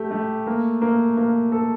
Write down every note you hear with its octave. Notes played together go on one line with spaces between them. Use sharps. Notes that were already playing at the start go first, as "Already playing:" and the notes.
Already playing: A3 G4
A3
A#3
A#3
A#3
A4